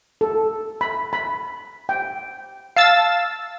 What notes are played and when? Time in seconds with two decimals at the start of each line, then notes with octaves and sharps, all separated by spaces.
0.21 A4
0.81 B5
1.13 B5
1.89 G5
2.77 F5 A5 E6 A6